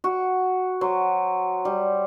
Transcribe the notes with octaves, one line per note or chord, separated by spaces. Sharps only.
F#4
F#3 C5
G3